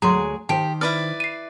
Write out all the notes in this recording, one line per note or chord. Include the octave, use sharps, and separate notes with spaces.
D2 F#3 G#3 G#4 A#5 C6
D#3 G4 C5 A5 D7
E4 B4 D5 F6
C7 D#7